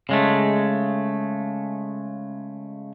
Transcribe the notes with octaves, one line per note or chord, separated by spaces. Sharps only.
C#3 G#3 A3